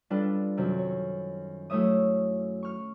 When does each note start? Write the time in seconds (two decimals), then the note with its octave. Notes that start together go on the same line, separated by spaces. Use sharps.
0.10 G3 D4 F4 A4 B4
0.57 F#2 C3 D#3
0.79 C#5
1.70 F#3 A3 E4 C#5 E5 D#6
2.63 C#6 F6